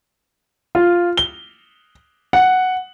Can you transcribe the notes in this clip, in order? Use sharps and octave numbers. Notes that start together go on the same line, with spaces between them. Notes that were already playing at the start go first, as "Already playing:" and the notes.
F4
G7
F#5